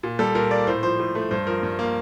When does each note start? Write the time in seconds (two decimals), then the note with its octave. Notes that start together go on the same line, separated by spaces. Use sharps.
0.03 A#2
0.19 G3 A4
0.35 A#2 A#4
0.51 A#3 D5
0.67 A2 C5
0.83 F3 C5
0.99 A2
1.15 A3
1.31 G2 C5
1.47 F3 A#4
1.63 G2
1.79 A#3